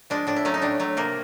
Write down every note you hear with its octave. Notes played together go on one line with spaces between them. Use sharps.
F3 G#3 D4
A2 D4
E4
F#3 A3 C#4
D#4
A2 D4
F#3 A3
C3 A#3